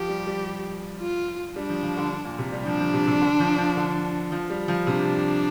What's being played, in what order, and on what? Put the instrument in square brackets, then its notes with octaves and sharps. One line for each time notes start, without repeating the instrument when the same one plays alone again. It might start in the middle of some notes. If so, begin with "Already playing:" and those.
Already playing: [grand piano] F3 [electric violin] G4
[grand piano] G3
G3
[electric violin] F4
[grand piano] G3 [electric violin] D4
[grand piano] F3
F3
D3
A#2
C3
G3
[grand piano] F3 [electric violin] D4
[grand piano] F3
C3
C3
D3
F3
F3
D3
F3
G3
F3
[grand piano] C3 [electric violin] D4